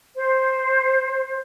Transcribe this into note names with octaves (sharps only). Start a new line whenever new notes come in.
C5